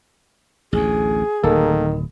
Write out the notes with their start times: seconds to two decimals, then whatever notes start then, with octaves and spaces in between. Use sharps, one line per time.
0.73 A1 D2 G#4
1.44 D1 D#3 A#3 A4